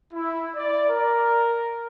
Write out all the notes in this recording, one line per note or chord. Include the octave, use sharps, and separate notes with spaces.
E4
D5
A#4